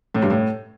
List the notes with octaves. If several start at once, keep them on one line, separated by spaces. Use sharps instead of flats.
A2
G2
A2